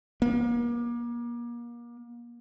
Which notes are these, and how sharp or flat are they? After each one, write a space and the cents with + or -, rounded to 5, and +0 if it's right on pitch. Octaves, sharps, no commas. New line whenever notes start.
A#3 +35